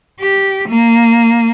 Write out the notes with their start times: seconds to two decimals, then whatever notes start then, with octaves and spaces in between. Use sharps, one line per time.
0.21 G4
0.69 A#3